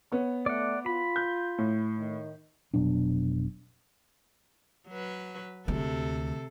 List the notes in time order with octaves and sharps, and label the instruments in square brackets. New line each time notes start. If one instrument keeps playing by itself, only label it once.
[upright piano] B3 C#5
[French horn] A3 [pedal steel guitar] D5 F#5
[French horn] F4 [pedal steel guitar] B5
[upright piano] G6
A2
[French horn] D#3
[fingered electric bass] F1 B2 F#3 D4
[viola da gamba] F#3 B4
[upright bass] D2 G#3 [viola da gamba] C3 A4